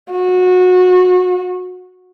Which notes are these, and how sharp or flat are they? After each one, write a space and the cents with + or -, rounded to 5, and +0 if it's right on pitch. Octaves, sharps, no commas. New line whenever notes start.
F#4 -25